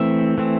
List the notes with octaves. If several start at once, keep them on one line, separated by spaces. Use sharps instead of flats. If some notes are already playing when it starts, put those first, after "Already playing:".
Already playing: E3 A3 C4 E5
E3 A3 C4